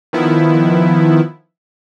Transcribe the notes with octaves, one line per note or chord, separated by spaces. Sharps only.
D#3 F3 B3 E4